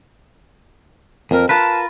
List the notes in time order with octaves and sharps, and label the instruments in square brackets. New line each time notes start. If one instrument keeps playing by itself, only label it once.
[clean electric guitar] F2 [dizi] A#4
[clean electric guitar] F4 A#4 B4 [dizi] A5